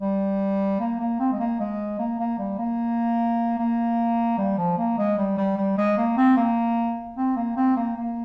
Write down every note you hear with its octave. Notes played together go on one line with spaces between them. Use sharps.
G3
A#3
A#3
C4
G#3
A#3
G#3
A#3
A#3
G3
A#3
A#3
G3
F3
A#3
G#3
G3
G3
G3
G#3
A#3
C4
A#3
C4
A#3
C4
A#3
A#3